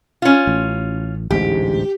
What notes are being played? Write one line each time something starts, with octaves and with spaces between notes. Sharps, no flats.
C#4 F4
A1
A1 D2 G#2 G4